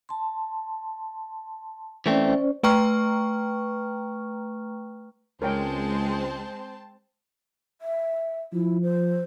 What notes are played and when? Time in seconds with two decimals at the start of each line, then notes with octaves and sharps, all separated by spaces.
0.09 A5 C6
2.06 E3 A3 C4 C#4 C5 D5
2.63 A3 B4 G5 A#5 C#6 F6
5.42 C#2 G#3 C4 A#4 C5 C#5 G5 A5
7.81 E5
8.53 F3 E4
8.83 C5